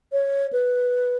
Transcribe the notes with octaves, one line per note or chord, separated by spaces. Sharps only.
C#5
B4